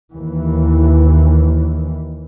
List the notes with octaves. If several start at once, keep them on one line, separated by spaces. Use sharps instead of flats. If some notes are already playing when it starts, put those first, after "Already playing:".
D#2 E3